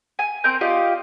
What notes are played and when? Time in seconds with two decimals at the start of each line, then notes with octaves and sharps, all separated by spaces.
0.19 G#5
0.44 C4 A#4 G6
0.61 F4 G4 D5 D#5